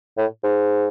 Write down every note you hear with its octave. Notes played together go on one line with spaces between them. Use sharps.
A2
G#2